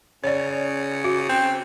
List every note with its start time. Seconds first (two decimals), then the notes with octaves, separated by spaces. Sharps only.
0.24 C#3 C#5 D5
1.04 F#4
1.29 C4